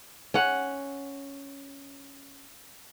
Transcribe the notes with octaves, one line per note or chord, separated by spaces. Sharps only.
C#4 F#5